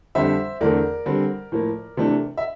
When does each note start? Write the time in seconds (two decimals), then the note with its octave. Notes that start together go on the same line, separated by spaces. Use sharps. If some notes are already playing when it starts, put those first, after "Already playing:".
0.15 F2 D3 G3 C5 E5
0.61 E2 D3 A3 C4 A#4 D5
1.06 D3 G3 C4
1.52 A2 F3 A#3
1.97 C3 E3 A3 D4
2.37 E5